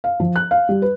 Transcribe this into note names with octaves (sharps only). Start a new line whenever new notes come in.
F5
F3
F#6
F5
G3
B4